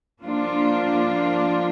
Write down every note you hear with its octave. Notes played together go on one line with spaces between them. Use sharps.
F3 A#3 D4 F4